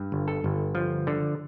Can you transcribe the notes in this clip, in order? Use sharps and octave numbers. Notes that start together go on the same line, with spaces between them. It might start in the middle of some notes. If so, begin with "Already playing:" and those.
Already playing: G2
G1
A4
G1
F3
D3